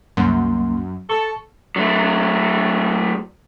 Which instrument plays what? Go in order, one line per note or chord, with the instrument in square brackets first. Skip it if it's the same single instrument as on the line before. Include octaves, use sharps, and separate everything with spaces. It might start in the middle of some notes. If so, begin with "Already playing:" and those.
[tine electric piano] C2 A#3 C6 [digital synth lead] F#2
[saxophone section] A4 [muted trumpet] A5 [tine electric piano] C#6
[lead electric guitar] F#3 A3